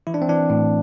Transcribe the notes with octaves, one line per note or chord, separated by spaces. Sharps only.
E3 E4
D4
C4
E3 D4
A2